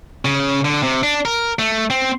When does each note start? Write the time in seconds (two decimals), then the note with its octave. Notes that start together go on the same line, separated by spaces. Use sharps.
0.25 C#3
0.65 D3
0.83 C3
1.03 D4
1.25 A#4
1.59 A3
1.90 C4